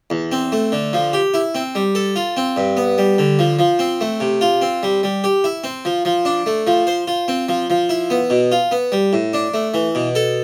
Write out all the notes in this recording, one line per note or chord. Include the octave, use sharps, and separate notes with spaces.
E2
C4
A3
D3
F3
G4
E4
C4
G3
A4
F4
C4
G2
B3
G3
D3
F3
F3
C4
A3
C3
F4
C4
G3
G3
G4
E4
C4
F3
F3
D4
A3
F3
C5
F4
C4
F3
F3
E4
B3
B2
F4
B3
G3
A2
D4
A3
E3
B2
A4